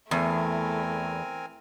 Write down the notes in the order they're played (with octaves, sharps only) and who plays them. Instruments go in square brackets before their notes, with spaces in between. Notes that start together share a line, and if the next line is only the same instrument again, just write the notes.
[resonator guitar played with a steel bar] E2 [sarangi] A3 [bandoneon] C4 A#4 G#5